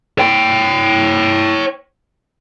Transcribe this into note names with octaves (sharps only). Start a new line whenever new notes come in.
C#5 G5